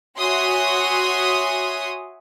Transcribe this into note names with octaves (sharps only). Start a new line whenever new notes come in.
F#4 C#5 E5 G#5 C6 D#6